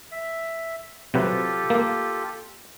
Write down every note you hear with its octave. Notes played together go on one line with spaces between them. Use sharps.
E5
C3 F#3 F4 G4 A4 B4
A#3